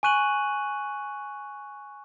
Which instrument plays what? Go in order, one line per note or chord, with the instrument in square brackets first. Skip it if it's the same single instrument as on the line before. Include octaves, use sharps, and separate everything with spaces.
[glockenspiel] G#5 C#6 F#6 D#7 F#7